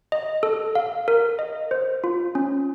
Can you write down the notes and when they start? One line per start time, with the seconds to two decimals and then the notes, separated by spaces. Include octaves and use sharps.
0.12 D#5
0.43 A4
0.75 F5
1.08 A#4
1.39 D#5
1.71 C5
2.04 F4
2.35 C#4